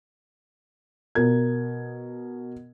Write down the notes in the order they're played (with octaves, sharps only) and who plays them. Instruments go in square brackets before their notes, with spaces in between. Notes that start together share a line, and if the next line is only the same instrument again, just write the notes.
[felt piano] B2 A#4 G#6